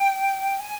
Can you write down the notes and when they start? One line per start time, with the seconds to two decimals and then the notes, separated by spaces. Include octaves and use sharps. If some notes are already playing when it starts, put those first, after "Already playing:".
Already playing: G5
0.59 G#5